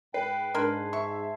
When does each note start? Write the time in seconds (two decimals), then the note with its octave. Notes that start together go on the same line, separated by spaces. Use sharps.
0.14 G#2 B4 G5 C7
0.54 G#2 D4 A#4 A5 C6 G#6
0.93 E5 C#6